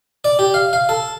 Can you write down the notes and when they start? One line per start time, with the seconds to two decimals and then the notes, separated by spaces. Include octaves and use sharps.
0.24 D5
0.39 G4
0.54 F5
0.73 F5
0.89 A4